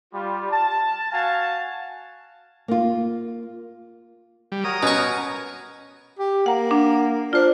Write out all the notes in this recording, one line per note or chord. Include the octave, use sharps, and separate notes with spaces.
G3 F4
A5
F#4 F5 G#5 A5
A#3 F4
G3
F#4 A#4 C#5 A#5 D#6
B2 C#4 C#6
G4
A#3 F#5 A#5
D4
D4 F4 C5